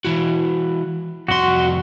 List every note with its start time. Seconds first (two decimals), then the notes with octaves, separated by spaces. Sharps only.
0.05 E3 E4 F#4
1.28 C2 F2 F#4 C6